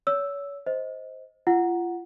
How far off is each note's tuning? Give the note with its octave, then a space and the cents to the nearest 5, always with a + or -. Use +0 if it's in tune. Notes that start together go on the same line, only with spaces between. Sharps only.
C#5 +35 E6 +0
C5 +0 D#5 +15
F4 -30 F#5 +0